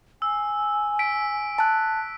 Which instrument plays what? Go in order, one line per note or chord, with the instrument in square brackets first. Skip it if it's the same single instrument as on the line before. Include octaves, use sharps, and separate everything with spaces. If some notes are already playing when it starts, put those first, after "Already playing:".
[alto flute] G#5 [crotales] E6
[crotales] B6 D7
[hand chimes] A5 F#6